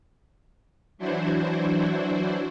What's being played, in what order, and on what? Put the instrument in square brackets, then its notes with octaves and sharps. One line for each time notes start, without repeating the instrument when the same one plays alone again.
[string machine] E3 F#3 D4 E4 F#4 C5